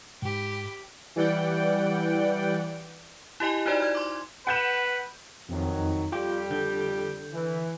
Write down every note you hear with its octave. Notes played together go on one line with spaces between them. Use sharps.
G#2 G4 B5
E3 G3 D5 F#5 G5
E4 G4 D#5 G#5
D#4 E4 F#4 C5 D5
D5 F6 G#6
C6 D6
B4 F#5 G6 E7
F2 D#3 F#3 C4 D#4
F2 G3 F4 G4 G5 D6
D3 G6
E3